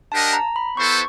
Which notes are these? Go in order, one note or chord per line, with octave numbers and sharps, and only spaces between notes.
D4 G4 A#4 D#5 F#5 A5
A#5
B5
B3 E4 A4 C5 C#6